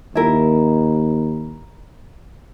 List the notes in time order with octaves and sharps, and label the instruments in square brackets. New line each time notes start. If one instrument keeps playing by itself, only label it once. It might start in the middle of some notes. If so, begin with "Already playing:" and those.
[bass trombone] D#2 [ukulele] E4 A#4